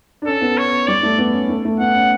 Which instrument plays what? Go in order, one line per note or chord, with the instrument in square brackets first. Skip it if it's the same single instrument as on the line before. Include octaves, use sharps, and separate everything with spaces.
[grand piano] D4
[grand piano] C#4 [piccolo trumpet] A4
[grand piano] B3
[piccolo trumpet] C#5
[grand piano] G3 [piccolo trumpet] D5
[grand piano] A3
B3
C#4
A3
A3
[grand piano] B3 [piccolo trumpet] F#5
[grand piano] C#4